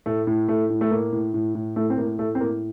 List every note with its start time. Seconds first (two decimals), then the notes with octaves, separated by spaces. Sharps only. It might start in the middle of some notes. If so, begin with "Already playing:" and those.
0.06 A2 A3
0.27 A2
0.49 A2 A3
0.70 A2
0.81 A3
0.91 A2 A#3
1.12 A2
1.34 A2
1.55 A2
1.76 A2 A3
1.90 C4
1.98 A2 A#3
2.19 A2 A3
2.35 C4
2.40 A2 A#3